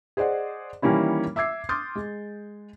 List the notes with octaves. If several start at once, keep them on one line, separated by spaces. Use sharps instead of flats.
G#4 C5 D5 D#5 F#5
D#3 E3 G3 A#3 C#4 E4
E5 D6 E6 G#6 C7
C6 D6 D#6 F6 G6 A6
G#3